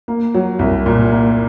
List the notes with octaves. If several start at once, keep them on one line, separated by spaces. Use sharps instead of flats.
A#3
F#3
C2
A#2
A#3